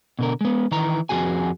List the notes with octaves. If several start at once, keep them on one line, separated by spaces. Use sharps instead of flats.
B2 D3 A#4
G#3 B3
D#3 E3 A#5
F2 C3 F#4 G#4 G#5